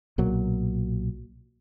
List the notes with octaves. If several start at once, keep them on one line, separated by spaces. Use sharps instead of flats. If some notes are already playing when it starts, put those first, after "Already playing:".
B1 A#2 F#3